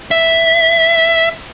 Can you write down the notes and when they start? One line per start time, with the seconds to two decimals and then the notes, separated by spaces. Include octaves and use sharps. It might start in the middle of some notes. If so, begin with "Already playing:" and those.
0.11 E5